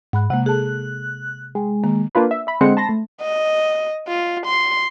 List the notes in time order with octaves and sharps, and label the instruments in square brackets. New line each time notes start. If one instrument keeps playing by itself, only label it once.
[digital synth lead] G#2 [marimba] F#5 B5 F#6
[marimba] C3 G#3 A#3 [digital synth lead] F#5
[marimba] G#4 A4 A5 [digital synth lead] F#6
[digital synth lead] G#3 [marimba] G5
[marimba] D#3 A#3
[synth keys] A#3 D4 F4 B4
E5
E5 B5
D3 G#3 C4 C5 F#5 C#7
A5 B5 C6 A#6
A3
[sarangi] D#5
F4
C6